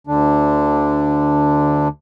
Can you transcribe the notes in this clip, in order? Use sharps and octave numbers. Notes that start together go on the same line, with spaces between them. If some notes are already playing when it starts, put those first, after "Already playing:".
D2 D3 D4